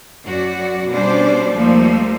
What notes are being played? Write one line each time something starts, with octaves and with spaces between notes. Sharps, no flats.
F#2 F#4 D5
B2 G3 C#4 D4 C5 D5
D#2 F3 G3 A3 A#3